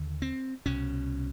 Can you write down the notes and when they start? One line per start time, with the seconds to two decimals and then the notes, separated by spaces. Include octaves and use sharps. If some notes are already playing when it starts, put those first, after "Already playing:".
Already playing: D#2 D3
0.22 C4
0.66 C2 B2 C#4